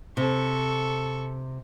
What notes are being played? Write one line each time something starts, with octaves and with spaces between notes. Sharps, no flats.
C3 A4 C#6